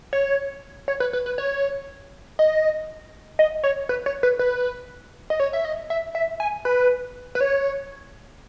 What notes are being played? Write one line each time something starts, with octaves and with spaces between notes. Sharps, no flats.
C#5
C#5
B4
B4
B4
C#5
D#5
D#5
C#5
B4
C#5
B4
B4
D#5
C#5
E5
D#5
E5
E5
G#5
B4
B4
C#5